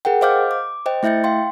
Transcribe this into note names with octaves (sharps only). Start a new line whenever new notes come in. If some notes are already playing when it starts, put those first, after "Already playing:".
G#4 A#4 F#5 G5
C5 D#5 F5 D6 F6 G6
D6
C5 D#5 G5
A3 E4 E5 G6 A6 C#7
F5 G5 C6